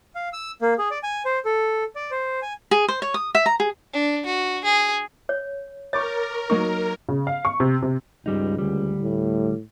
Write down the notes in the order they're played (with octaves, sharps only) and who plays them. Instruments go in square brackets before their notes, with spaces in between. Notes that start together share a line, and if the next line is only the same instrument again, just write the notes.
[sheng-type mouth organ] F5
E6
A#3
G#4
D5
G#5
C5
A4
D5
C5
G#5
[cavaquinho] G#4
C5
C#5
D#6
E5
A#5
G#4
[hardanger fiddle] D4
F#4
G#4
[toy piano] C#5
[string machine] A#4 [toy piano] C#5 [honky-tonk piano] C#6 D6 A6
[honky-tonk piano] F#3 A#3 D#4 [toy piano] C#6
[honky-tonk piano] C#3
F5
C#6
C3
C3
[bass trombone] C#2 [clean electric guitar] G2 G3 D#4
[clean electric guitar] D2 G3
[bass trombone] A2